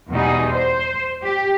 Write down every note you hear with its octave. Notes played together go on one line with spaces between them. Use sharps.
E2 B2 G3 D#4 G#4
C5
G4